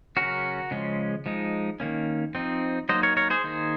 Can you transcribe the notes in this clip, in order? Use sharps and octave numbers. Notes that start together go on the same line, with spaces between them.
C#3 F#3 C#4 F#4 A#4
C#3 F3 G#3 C#4
F3 G#3 D#4
D#3 A#3 C#4
F3 C4 D#4
F#3 A#3 D#4 C5 D#5
A#4 C#5
A#4 C#5
G#4 C5
D#3 A#3 D#4